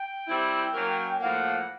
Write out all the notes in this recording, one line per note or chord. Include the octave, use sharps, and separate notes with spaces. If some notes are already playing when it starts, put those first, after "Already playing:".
Already playing: G5
G3 C4 E4
F#3 A#3 C#4 F#4 A#4
A2 F3 A#3 F#5